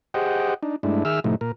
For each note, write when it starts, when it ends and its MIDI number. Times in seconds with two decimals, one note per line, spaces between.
0.14 0.54 67
0.14 0.54 68
0.14 0.54 72
0.14 0.54 75
0.14 0.54 78
0.14 0.54 79
0.63 0.76 62
0.63 0.76 63
0.83 1.04 43
0.83 1.04 56
0.83 1.04 57
0.83 1.04 62
0.83 1.04 64
1.05 1.20 51
1.05 1.20 68
1.05 1.20 76
1.05 1.20 88
1.05 1.20 89
1.24 1.35 45
1.24 1.35 48
1.24 1.35 53
1.24 1.35 57
1.24 1.35 63
1.41 1.52 46
1.41 1.52 70